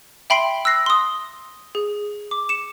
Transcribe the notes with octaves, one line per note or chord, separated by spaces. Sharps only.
E5 G5 B5 C6 C7 D7
E6 F#6 A#6 C7
C6 D#6
G#4
D6
C#7 E7